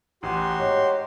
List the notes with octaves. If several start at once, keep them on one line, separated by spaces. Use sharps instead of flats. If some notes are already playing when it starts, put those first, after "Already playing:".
A1 F#4 G4 C6
G#2 C#5